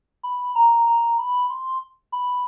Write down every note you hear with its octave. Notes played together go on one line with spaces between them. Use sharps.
B5
A#5
A#5
B5
C6
B5